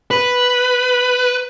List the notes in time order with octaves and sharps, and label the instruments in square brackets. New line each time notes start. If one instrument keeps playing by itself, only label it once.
[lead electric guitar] B4